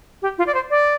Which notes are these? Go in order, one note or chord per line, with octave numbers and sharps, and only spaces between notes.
G4
F4
D5
C5
D5